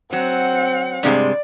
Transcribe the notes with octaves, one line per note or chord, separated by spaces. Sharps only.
F#3 C4 F#5
G2 C3 G#3 D5